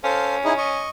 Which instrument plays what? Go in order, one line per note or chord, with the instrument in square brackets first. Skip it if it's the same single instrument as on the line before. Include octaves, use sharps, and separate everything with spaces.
[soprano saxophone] C#4 [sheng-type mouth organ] A4 C5 F5
[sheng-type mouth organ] D#4 E4 G#4
D#5 C#6